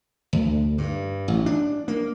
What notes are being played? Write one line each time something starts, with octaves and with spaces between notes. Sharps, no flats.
D2
G2
A1
D4
A#3